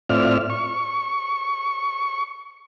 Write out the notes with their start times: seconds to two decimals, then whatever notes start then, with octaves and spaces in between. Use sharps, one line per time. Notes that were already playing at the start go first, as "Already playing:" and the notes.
0.09 A2 C4 F4 D5 E5 F6
0.50 C#6